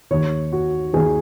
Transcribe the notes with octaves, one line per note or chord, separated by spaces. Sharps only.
D#2 D#3 C#5
F#4
D#2 D#3 G#4